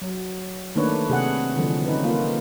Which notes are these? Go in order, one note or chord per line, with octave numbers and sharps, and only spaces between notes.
F#3
D#3 A3 A#3 D4 B4 C#5
C3 G#4 F#5
D3 E3 F3 G3
C#4 D#4 B4
A#3 F4